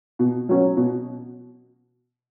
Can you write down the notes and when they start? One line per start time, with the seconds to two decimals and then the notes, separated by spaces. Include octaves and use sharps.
0.19 B2
0.49 F#3 C#4
0.77 B2